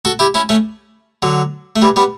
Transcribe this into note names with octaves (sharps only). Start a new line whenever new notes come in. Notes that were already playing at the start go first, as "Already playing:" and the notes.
F#4 A4
E4 G4
C#4 E4
A3 C#4
D3 F#3
A3
E3 G3
G3 B3